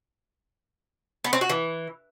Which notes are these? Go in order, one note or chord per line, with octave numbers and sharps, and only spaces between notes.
B3
C4
F#4
E3